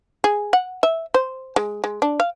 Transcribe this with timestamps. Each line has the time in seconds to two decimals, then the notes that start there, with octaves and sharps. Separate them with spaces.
0.24 G#4
0.53 F#5
0.83 E5
1.14 C5
1.56 G#3
1.84 G#3
2.02 D4
2.20 F5